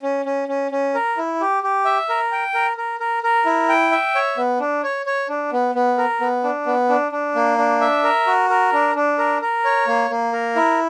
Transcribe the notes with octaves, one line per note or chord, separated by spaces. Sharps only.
C#4
C#4
C#4
C#4
A#4
E4
G4
G4
E5
A#4
G5
A#4
A#4
A#4
A#4
E4
G5
E5
C#5
B3
D4
C#5
C#5
D4
B3
B3
A#4
B3
D4
B3
D4
D4
A#3
D4
E5
A#4
F#4
A#4
D4
D4
A#4
A#4
C#5
A#3
A#3
A#4
E4